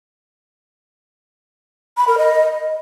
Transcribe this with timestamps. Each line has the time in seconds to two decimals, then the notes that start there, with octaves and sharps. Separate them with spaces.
1.97 B5
2.07 A#4
2.18 D#5